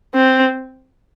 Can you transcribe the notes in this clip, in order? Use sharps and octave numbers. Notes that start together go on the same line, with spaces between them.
C4